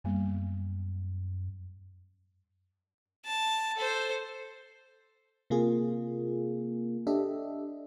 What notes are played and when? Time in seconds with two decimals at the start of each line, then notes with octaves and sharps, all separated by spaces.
0.04 F#2 G3 A#3 B3
3.25 A5
3.77 A4 C5
5.50 C3 A#3 F4 G#4
7.07 D4 G4 A4 D#5 E5